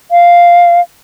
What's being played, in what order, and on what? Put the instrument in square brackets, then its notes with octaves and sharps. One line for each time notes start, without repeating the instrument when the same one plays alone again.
[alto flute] F5